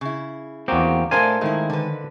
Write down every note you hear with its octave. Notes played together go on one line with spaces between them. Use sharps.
C#3 E4
E2 A#3 C4 F#4 G4
A2 A3 D4 A#4 C5 D5 F5 G#5
D#3 G#3 A3 E4
D3 B4